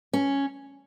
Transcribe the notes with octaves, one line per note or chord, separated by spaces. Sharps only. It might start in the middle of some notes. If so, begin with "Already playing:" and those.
C#4